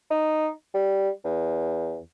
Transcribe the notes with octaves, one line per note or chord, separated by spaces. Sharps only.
D#4
G3
E2